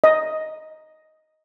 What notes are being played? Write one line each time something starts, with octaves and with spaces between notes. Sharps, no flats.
D#5